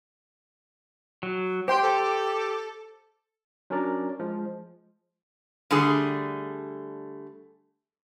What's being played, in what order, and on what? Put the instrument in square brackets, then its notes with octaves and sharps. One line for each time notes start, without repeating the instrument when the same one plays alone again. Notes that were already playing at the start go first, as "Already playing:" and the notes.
[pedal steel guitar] F#3
[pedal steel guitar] G4 [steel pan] C5 G5 [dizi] C6
[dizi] A4
[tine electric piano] F#3 C#4 D4 A#4 D5
F3 G#3
[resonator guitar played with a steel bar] D3 G3 A3 G#4